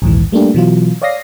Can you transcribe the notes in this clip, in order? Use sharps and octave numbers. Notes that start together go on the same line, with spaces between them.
A#1 D#2 G#2 E3
G3 A3 A#3 D4 G4
B2 E3 F#3 F4
C#5 D5 F5 D#6 A#6 C7